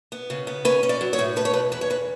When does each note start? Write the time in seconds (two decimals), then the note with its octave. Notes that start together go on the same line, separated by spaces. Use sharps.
0.12 B3
0.30 C#3
0.47 B3
0.65 C#4 B4
0.83 C#4
0.89 D5
1.01 F#3
1.13 C#5
1.19 A2
1.36 A3 B4
1.45 C#5
1.53 B2 B4
1.72 E2 B4
1.81 C#5
1.90 E2 B4